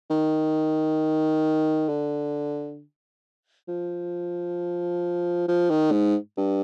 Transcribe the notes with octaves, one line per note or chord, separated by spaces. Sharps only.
D#3
D3
F3
F3
D#3
G#2
G2